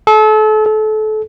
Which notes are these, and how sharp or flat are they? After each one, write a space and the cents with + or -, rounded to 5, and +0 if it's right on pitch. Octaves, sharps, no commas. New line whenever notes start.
A4 -35
A4 -30